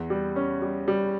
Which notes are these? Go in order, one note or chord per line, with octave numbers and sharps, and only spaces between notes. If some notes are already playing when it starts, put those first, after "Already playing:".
Already playing: E2
G3
C#4
G3
G3